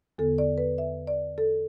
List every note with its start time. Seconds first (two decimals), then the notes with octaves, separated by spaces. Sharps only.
0.18 E2 D3 B3 A4
0.38 D5
0.58 B4
0.78 E5
1.07 D5
1.38 A4